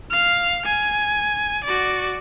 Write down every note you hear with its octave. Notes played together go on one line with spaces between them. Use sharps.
F5 F6
G#5
F#4 D5